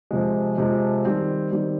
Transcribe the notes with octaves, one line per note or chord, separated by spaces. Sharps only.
F2 C3 F3 G#3
F2 C3 F3 G#3
D#3 G3 C4
D#3 G3 C4